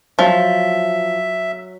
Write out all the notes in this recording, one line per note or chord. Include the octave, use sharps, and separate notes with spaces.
F3 F#3 E5